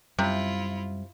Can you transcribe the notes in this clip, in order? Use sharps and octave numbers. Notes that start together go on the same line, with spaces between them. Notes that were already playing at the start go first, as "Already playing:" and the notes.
F#2 C3 G3 E4 F4